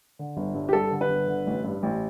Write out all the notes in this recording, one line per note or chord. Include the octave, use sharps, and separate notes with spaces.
D3
G1
G2
G4
G3 A4
D3
B4
G1
D3
A1
G2
A1